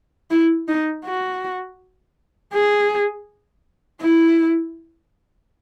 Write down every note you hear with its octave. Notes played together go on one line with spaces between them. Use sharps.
E4
D#4
F#4
G#4
E4